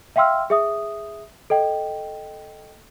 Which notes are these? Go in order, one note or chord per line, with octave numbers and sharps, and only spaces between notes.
E5 F5 G5 C6 E6 F6
G#4 E5 D#6
A4 D#5 G5